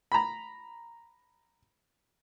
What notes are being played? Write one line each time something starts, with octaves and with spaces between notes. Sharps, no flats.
A#5 B5